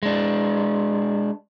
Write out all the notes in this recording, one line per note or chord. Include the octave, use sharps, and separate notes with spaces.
G#3 D4